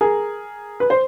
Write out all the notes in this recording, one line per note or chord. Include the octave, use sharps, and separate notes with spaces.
G#4 A#4
B4
C5